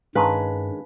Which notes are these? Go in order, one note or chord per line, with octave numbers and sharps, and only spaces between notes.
G2 D#3 G#3 C#4 B4 F5 G#5 A5